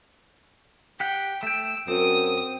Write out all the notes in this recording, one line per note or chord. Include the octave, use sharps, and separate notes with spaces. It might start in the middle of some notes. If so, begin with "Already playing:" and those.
G4 F#5 G5
A3 G5 E6
F#2 C4 D#6